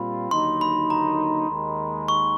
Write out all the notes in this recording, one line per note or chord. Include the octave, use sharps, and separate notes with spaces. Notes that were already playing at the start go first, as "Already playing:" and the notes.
Already playing: A#2 G3 C4 F4 B5
D#2 D3 F#3 A#3 D#4 C6
B5
A#5
D#2 D#3 G#3
C#6